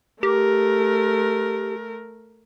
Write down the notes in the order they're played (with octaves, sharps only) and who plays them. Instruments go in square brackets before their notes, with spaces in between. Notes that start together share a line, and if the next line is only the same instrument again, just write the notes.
[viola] A3 A#4 [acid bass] G4